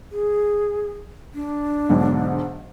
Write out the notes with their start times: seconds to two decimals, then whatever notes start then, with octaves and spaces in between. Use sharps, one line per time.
0.12 G#4
1.34 D4
1.89 B1 G#2 D3